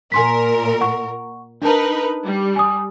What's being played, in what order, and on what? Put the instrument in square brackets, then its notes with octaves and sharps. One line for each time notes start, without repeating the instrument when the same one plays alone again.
[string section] A#2 A#4 [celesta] G#5 C6 B6
[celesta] F#5 C#6
[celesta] D4 A5 [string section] D#4 A#4 B4
[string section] G3
[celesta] G#5 D#6